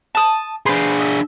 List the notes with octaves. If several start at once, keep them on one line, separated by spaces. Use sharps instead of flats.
A5 D#6
D4 G#4 B4 C5 C6
D#5 E5